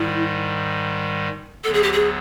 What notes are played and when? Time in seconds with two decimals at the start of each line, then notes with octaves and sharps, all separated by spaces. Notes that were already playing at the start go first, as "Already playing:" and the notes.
Already playing: G#2 D#3 G3 E4
1.64 D2 D3 F#3 B3 A4
1.74 G#4
1.83 G4
1.93 G#4